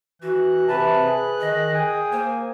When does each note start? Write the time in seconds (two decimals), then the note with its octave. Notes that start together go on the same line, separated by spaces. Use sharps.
0.22 E3 F#4 F#6
0.69 C3 B4 E5 A5
1.05 G#4 B4
1.40 D#3 D#5
1.74 G#4 G5 G#5 D#6
2.12 A#3 C5